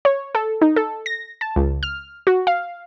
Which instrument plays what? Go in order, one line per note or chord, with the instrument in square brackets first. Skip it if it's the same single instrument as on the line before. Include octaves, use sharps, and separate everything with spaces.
[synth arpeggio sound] C#5
A4
D#4
A4
A#6
A5
C#2
F6
F#4
F5